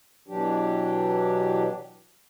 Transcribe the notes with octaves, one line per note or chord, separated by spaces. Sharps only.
B2 E3 F#3 D4 G4